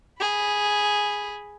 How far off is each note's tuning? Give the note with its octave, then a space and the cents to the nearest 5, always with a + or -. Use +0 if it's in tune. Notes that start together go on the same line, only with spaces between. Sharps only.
G#4 +0 B5 +0